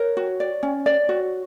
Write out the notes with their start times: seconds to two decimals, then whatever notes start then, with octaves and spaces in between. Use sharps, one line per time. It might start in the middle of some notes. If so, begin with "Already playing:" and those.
Already playing: A#4 C#5
0.17 F#4
0.40 D5
0.63 C#4
0.86 D5
1.09 F#4